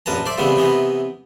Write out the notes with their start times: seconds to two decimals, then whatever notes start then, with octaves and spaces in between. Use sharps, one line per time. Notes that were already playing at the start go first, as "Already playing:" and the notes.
0.06 A#1 F#2 B4 A5 A#5
0.26 C5 D5 E5
0.38 C#3 E3 G3 B3 C4
0.56 C3 E3 B3 D#4